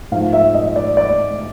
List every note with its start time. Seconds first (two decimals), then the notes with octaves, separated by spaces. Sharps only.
0.11 G#2 F3 A3 F5
0.33 E5
0.54 D#5
0.76 D5
0.97 D5